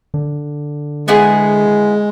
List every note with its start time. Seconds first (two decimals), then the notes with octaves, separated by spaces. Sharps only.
0.14 D3
1.08 G#3 B3 E4 G#4